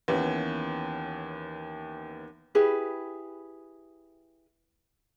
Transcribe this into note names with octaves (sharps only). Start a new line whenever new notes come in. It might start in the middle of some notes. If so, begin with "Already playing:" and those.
D#2 E3 B3 C#4
E4 G4 G#4 B4